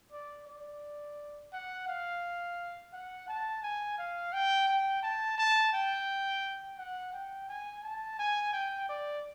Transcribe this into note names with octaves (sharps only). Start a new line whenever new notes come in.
D5
D5
F#5
F5
F#5
A5
G#5
F5
G5
G5
A5
A5
G5
F#5
G5
G#5
A5
G#5
G5
D5